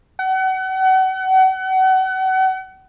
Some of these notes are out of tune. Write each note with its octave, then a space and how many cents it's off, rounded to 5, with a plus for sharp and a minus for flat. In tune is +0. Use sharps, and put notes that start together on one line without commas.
F#5 +35